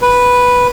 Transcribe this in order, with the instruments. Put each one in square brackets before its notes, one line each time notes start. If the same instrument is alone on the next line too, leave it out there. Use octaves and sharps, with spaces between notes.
[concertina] B4